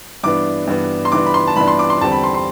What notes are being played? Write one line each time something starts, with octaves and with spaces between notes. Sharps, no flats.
G2 E3 B3 D4 D6
G2 E3 B3 D4
C6
G2 E3 B3 D4 D6
B5
C6
A5
G2 E3 B3 D4 B5
C6
D6
C6
E2 D3 G3 C4 A5
B5
C6
C6